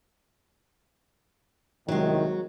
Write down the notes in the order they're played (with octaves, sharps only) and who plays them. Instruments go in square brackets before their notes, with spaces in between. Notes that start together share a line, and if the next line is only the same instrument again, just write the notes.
[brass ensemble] C2 A2 D#3 [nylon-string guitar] F#3 G#3